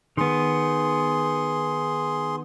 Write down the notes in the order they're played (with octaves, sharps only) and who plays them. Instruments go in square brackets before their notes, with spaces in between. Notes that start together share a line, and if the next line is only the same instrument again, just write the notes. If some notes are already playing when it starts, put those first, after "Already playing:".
[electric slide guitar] D#3 B3 [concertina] G#4 C6